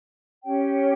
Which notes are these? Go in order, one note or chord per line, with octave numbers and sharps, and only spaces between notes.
C#4 G4 C#5 G5